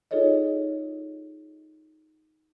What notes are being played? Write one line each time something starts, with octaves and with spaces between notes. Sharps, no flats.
D#4 F4 G#4 A4 C#5 D#5